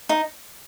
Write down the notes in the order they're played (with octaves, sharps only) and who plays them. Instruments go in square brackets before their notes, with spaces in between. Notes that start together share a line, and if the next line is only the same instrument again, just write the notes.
[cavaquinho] D#4